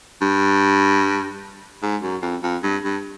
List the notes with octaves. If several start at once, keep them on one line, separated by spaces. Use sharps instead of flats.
G2
G#2
F#2
F2
F2
G2
G2